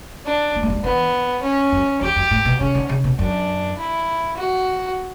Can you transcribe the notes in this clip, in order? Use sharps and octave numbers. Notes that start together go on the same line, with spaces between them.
D4
B3
A3
G3
F#3
E3 B3
C#4
F#2
E2 G4
F#2
A2
B2
C#3 C#4
D3
C#3
B2
F#2 D4
E4
F#4